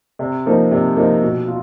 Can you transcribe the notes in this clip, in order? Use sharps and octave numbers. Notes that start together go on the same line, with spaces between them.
C3
F3 A#3 D#4
C3
F3 A#3 D#4
B2
F4